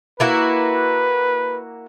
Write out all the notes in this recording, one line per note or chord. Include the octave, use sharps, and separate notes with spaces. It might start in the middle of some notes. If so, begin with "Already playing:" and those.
A#3 E4 F#4 B4